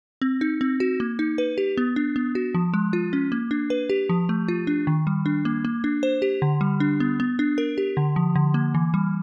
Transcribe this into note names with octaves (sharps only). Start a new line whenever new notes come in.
C4
D#4
C4
F#4
A#3
D#4
B4
G4
B3
D4
B3
F#4
F3
G#3
F4
C#4
A#3
D4
B4
G4
F3
A3
F4
D4
D#3
G3
D4
A#3
A#3
D4
C5
G4
D3
G3
D4
B3
B3
D4
A#4
G4
D3
F3
D3
A#3
E3
G3